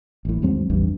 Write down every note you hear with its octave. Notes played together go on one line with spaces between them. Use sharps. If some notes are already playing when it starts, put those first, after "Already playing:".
A1 A2
D#2 G#2 F#3 C4
A1 E2 G2